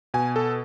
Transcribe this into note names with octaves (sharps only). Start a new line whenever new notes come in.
B2 G#5
A4